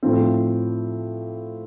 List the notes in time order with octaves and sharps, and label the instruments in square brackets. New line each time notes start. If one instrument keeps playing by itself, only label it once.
[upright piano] A2 F3 C4